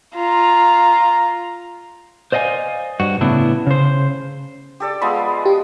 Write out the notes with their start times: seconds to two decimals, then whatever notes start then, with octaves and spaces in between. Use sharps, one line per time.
0.15 F4 A#5
2.32 C5 D5 D#5 F5 G#5
3.00 G2 F#4
3.21 A2 C#3 B3 D4 E4
3.67 C#3 C5
4.80 G4 A4 D5
5.02 F3 G#3 B3 B5
5.46 G4